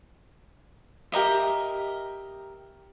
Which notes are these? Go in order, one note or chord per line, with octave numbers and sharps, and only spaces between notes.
G4 A#4 D#5 E5